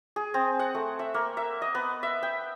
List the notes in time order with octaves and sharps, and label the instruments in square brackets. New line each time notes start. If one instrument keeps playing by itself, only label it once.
[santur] G#4
C4
F#5
A3
E5
A#3
E5
D#5
B3
E5
G5